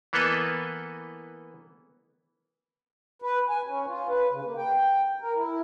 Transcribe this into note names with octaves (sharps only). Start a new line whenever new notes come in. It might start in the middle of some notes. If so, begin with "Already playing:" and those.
E3 A#3 B3 A4 B4 D#5
B4
G#5
C#4
F4
B4
C#3
A#3
G5
A#4
E4